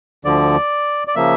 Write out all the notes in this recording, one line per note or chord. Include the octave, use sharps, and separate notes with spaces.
D2 D3 F3 D5
D5
C#3 F3 A#3 E5